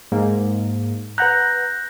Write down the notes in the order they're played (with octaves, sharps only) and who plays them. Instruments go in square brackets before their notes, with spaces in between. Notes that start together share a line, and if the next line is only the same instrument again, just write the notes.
[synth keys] G#2 A#3
[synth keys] B4 F#5 A#5 [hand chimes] F#6 G6 A#6